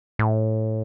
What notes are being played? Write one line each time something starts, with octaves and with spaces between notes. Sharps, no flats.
A2